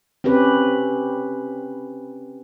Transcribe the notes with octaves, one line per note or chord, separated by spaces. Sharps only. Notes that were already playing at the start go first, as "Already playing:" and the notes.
C4 C#4 G4 B4